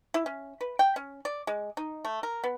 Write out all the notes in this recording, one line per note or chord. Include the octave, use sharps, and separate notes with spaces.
E4
C#4
B4
G5
C#4
D5
G#3
D#4
A3
A#4
B3